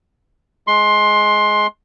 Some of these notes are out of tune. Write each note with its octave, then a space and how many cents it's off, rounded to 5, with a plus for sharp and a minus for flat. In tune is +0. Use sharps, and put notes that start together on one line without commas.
G#3 +15 C6 +15